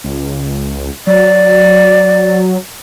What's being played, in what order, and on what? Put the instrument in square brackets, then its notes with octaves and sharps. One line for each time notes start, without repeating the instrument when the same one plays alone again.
[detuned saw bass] C#2
[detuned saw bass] F#3 [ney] D5